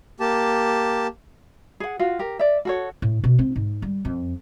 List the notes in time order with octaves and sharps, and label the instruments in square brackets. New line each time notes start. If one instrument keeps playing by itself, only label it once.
[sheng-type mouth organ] A#3 G4 A5
[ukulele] G#4 F#5
F4 F#4
G4 A#4
D5 E5
F#4 A4 C#5
[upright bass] A2
B2
C4
G#2
G3
F2